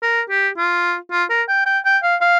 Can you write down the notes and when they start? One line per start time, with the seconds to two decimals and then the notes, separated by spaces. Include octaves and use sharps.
0.02 A#4
0.30 G4
0.57 F4
1.12 F4
1.30 A#4
1.49 G5
1.66 G5
1.85 G5
2.03 F5
2.21 F5